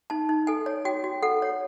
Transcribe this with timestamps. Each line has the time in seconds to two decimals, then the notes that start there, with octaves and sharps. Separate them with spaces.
0.10 D#4 A5
0.29 D#4
0.47 A4 G#5
0.66 C#5
0.85 F#4 G5
1.04 F#4
1.22 A4 F#5
1.42 C#5